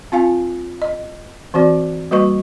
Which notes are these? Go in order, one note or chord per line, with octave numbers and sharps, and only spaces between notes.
C4 F4 F5 G#5
D#5
E3 C4 F#4 D5
G3 A#3 F#4 B4 D#5 C#6